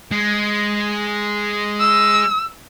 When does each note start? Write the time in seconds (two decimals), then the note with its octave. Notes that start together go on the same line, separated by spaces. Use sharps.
0.11 G#3
1.80 E6